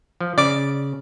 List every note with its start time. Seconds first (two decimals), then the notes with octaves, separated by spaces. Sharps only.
0.21 F3
0.38 C#3 D5 D6